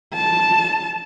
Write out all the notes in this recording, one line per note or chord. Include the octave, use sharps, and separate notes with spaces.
A5